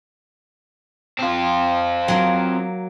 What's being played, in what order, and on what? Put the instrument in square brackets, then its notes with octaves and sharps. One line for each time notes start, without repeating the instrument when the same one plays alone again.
[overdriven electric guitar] C4 F4
[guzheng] F#3 A#3